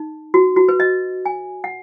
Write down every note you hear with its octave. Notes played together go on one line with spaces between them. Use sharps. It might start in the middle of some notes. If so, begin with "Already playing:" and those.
Already playing: D#4
F#4
F#4
B4
D#5
G#5
F#5